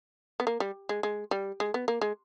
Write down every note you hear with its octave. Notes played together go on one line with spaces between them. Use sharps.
B3
A#3
G3
G#3
G#3
G3
G#3
B3
A#3
G#3